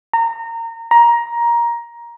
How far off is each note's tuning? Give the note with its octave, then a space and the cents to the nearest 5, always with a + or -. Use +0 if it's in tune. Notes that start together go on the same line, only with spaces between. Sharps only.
A#5 -25
A#5 +15